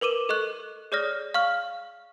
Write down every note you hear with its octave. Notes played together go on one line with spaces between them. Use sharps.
A#4 B4 D6 D#7 E7
A4 D#5 C#6 F#6
G#4 C#5 D5 D#6 F6 A#6
F5 C#6 F6